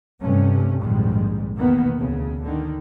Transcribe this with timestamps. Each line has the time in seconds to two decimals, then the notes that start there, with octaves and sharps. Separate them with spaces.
0.22 G2 C3 A3 C#4
0.81 A#1 F2 G#2 D#3 G3 G#3
1.56 E2 B2 D#3 A#3 B3
1.98 D2 C#3
2.43 D3 D#3